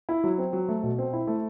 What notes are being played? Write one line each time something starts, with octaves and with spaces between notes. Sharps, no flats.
E4
F#3
C4
F#3
A3
B2
C4
E4
A3